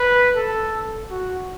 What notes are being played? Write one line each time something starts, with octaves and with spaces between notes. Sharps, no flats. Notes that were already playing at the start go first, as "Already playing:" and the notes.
Already playing: B4
A4
F#4